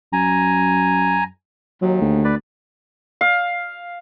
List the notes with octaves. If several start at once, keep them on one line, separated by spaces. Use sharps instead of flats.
F#2 G#5 A#5
D#2 F#3
D2
B4 D5
F5